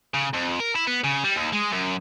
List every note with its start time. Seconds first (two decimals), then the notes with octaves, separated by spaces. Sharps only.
0.14 C#3
0.34 F2
0.60 A#4
0.75 E4
0.87 B3
1.04 C#3
1.24 G3
1.36 D#2
1.52 G#3
1.72 F#2